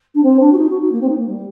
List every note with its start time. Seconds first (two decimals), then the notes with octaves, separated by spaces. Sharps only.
0.14 D4
0.23 C4
0.39 D4
0.52 F#4
0.57 D#4
0.69 F#4
0.80 D#4
0.91 A#3
1.00 C4
1.09 D#4
1.17 A#3
1.27 G3